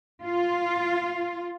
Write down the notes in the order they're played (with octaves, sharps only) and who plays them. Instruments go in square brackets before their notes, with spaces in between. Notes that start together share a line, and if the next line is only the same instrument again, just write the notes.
[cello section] F4